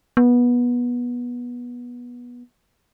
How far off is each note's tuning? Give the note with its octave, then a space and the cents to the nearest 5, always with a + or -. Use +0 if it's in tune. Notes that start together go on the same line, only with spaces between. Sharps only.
B3 -20